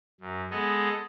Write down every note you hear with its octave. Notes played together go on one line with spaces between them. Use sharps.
F#2
G#3 B3 G#4 A4 D#5